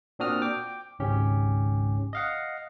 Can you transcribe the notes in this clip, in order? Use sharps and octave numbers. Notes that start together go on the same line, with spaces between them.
A#2 C4 D4 F#4 D#6 F6
G5 D6
G#1 C#2 G#2 C#3 C#4 G4
D#5 F5 F#5